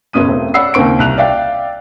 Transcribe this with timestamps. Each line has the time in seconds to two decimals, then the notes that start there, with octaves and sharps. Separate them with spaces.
0.13 F#1 B2 C#4 D#6 D#7
0.28 E1 A3 C4
0.54 C#5 D5 F#5 B5 E6 C7
0.74 D#2 C#3 A#3 C4 C#6 D7
0.99 C2 F#6 F7
1.18 D5 E5 F5 G5